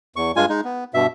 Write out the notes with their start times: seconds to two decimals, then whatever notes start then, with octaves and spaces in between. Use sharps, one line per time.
0.16 E2 C#6
0.36 G2 G#3 F4 G#5
0.49 G#3 D#4
0.64 B3
0.94 G2 B2 E5